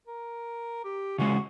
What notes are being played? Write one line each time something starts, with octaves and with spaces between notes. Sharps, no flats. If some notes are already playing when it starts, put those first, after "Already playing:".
A#4
G4
C#3 E3 G#3 F#4